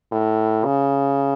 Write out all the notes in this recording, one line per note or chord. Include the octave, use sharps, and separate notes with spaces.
A2
C#3